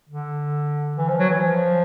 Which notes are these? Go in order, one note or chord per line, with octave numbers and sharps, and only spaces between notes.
D3
E3
F3
F#3
E3
F3